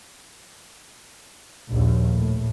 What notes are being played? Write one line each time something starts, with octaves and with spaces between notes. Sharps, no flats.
A#1 D#2
A2